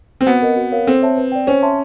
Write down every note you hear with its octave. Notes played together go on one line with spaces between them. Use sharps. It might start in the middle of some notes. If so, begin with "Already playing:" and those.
C4
B3 F#4
A#4 D#5
F#4
A#4 C#5 F5
C4 A4
C#5 E5 A5
B4
D5 G5
C#4 C5
E5 A5 C6